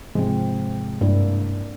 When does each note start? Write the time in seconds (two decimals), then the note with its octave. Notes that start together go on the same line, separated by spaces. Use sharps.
0.15 G#2 C3 F3 G#3 C4
1.01 G2 A#3 D4 E4